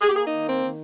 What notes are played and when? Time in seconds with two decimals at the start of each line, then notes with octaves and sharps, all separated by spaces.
0.02 A#3 G#4
0.09 G4
0.16 G#4
0.25 D#4
0.32 D#3
0.48 C4
0.63 D#3